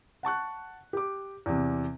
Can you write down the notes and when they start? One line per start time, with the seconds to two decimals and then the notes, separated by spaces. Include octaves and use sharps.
0.23 F#5 A5 C#6 F#6
0.93 G4 D6
1.46 E2 C3